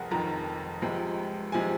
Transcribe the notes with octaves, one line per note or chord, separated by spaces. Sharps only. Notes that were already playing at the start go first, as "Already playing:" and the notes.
Already playing: F1 F2 G#4 A#4 F#5
F1 F2 D#3 A#5
C#2 C3 F3 G#3
C3 F3 G#3 G#5